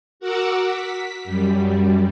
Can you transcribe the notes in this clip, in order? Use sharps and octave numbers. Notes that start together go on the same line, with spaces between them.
F#4 A#4 F#5 D6 E6
B6
F#2 G3